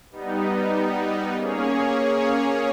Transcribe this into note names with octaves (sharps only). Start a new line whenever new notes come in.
G3 B3 D#4
A#3 C#4 G#4 C#5